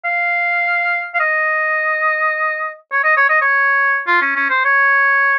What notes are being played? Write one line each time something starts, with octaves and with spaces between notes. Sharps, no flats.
F5
F5
D#5
C#5
D#5
C#5
D#5
C#5
F4
C#4
C#4
C5
C#5